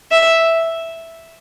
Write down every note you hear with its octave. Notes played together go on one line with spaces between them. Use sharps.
E5